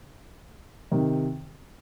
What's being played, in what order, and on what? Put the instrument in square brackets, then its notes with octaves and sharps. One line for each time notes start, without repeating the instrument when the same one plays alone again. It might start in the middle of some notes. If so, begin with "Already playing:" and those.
[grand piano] C3 D#3